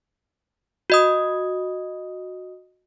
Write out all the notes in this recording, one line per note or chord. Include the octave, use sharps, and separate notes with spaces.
F#4 D#5 D#6